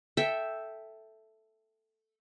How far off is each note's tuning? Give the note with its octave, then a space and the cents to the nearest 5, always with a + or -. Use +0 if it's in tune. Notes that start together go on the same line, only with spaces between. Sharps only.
A4 +0 E5 +0 G5 +0